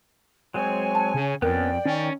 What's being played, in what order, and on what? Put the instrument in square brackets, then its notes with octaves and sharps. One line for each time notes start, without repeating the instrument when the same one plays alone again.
[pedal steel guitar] F#3 G#3 C4 [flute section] C#5 G#5
[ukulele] A5
[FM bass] C#3
[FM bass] F2 [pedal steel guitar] B3 C#4 [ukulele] A#4 [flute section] D5 G5
[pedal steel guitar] D#3 [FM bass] C#4